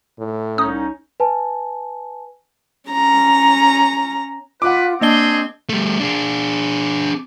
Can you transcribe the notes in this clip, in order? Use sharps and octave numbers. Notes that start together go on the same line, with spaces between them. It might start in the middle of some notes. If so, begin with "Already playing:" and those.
A2
C2 C#4 D#4 D#6
B4 G#5 A5
C#4 A#5
F4 B4 F#5 D6
A#3 C4 D4 G#4 D#5 G7
G3 A3
D4 G#4